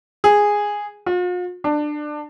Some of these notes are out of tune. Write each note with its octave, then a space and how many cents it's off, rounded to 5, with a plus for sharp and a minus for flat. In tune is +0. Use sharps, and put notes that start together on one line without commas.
G#4 -5
F4 +45
D4 +20